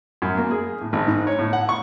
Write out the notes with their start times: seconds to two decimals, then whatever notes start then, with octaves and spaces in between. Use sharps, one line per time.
0.22 F#2
0.38 A#3
0.51 G#4
0.81 A2
0.93 G#1
1.08 G#2
1.27 C#5
1.39 A2
1.53 F#5
1.69 C#6